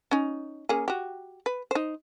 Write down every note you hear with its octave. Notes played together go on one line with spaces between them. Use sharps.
C#4 D#4
A#3 C#4 G#4
F#4 G4
B4
D#4 C5